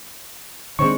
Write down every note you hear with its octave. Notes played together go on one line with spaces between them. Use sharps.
D#3 G#3 C4 D4 C#5 C#6